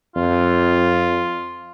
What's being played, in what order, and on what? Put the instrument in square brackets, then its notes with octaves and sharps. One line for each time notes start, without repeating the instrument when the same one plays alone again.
[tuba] F2 [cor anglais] F4